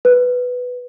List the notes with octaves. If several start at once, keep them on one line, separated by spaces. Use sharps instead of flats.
B4